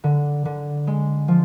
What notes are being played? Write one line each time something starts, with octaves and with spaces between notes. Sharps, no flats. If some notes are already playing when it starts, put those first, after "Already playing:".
D3
D3
G#3
F3